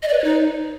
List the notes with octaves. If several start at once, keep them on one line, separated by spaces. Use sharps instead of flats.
D#5
D5
B4
C#5
D#4